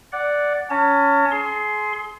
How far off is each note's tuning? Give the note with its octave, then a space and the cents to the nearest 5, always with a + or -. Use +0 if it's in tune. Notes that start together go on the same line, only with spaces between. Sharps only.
D5 -5 F#5 +0
C#4 +15 A5 +40
G#4 +30 C6 +0